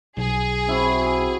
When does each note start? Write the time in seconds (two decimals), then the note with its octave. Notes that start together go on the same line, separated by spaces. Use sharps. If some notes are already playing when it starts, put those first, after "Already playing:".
0.17 B1 G#4
0.68 C4 E4 F#4 G4